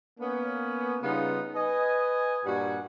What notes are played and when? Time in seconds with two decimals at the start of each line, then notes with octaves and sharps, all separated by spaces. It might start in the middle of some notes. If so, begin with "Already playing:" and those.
0.19 A#3 B3 C#4
1.02 C#3 G3 B3 D#4 F4
1.54 B4 D#5 G#5
2.45 G2 A#2 G3 F#4 F#5 G#5